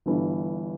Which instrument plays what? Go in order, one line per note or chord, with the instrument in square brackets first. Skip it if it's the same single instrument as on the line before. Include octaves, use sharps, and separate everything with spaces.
[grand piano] G1 G2 E3